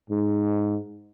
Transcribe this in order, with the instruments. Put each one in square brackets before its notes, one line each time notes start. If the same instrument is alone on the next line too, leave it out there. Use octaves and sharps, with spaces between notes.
[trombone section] G#2